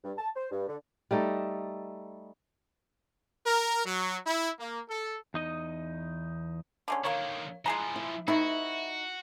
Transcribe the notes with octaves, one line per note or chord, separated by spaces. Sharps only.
G2
A5
C5
G2
D3
G3 A3 D#4 A4
A#4
F#3
E4
A#3
A4
E2 D#4 D#5
D3 G#3 C#4
D3 D#3 A#3 A#4 C#5
E3 F3 G#3 G#4 A#5
E4
C3 D#3 D#4 E4 F#4